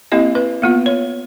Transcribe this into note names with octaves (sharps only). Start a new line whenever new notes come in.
A#3 C4 E4 G4 D#5
B4
A#3 B3 F4
C#5